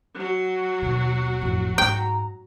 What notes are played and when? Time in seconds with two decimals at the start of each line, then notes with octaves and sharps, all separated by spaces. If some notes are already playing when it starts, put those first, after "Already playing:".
0.15 F#3 F#4
0.82 D#2 B2
1.42 A1 F2
1.78 G#2 G#3 G5 A#5